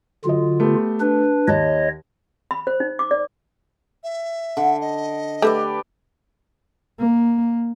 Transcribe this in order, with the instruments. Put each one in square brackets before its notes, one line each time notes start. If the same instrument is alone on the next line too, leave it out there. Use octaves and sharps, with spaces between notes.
[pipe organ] D3 F4 [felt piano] F#3 D#5
[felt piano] A3 B3 G4
[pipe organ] D4 B4
[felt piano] D#2 A5 [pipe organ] C#5 D#5
[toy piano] B5
C5
D#4
D6
D5
[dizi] E5
[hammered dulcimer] D3
[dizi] D#5
[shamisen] A3 [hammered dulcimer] G4 B4 D5
[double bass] A#3